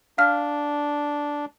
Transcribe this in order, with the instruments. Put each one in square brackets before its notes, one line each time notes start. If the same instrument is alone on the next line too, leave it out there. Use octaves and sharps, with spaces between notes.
[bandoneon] D4 [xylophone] F5 F6